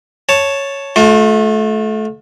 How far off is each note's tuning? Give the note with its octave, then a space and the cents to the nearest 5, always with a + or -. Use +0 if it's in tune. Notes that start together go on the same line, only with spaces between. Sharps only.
C#5 +0 A5 +0
A3 -25 F4 +35